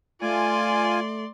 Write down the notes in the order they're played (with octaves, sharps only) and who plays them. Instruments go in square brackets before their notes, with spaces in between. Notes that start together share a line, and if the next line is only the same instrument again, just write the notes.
[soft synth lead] A3 [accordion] F4 G#5 [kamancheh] D5 C6